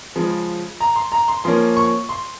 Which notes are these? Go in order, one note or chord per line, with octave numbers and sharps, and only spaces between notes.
C#3 F3 G#3
A#5
C6
A#5
C6
F3 A#3 C#4 C6
C#6
C6